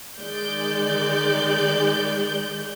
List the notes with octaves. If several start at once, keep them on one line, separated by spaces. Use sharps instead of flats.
D#3 G#3 D5 G6